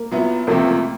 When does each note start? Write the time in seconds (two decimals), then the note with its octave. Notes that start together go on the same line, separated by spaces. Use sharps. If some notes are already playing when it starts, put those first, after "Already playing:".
Already playing: A#3
0.11 A#2 F#3 B3 E4
0.47 C#2 C3 F3 A3 A#3 C4